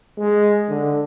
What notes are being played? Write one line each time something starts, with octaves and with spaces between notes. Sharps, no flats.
G#3
D3